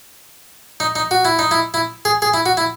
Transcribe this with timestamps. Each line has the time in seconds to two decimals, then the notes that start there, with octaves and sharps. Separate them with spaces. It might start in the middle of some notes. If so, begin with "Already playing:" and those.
0.80 D#4
0.96 D#4
1.11 F#4
1.25 E4
1.39 D#4
1.51 E4
1.74 E4
2.05 G#4
2.22 G#4
2.34 E4
2.46 F#4
2.57 E4